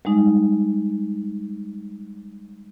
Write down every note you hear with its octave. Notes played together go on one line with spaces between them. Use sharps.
G3 G#3 D#4